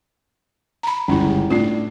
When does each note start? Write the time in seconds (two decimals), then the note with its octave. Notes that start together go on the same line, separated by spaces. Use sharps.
0.83 A#5 B5
1.08 G1 C#2 C#4 E4
1.29 G4
1.50 A2 D4 F4 C7